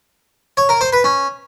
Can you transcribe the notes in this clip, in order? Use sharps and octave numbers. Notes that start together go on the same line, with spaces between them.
C#5
A#4
C5
B4
C#4